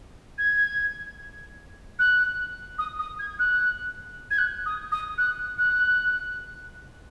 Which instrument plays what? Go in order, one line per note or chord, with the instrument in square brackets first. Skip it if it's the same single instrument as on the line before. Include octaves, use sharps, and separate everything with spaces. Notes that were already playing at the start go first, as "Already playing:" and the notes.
[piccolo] G#6
F#6
D#6
D#6
G#6
F#6
G#6
F#6
D#6
D#6
F#6
F#6